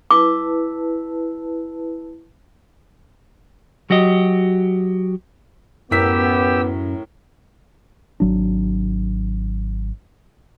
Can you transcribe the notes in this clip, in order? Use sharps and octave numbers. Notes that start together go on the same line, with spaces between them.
E4 B4 A5 D6
F#3 F#4 G4 D#5
F#2 A2 B3 G4 A#4 E6 B6
G#1 F#3 D4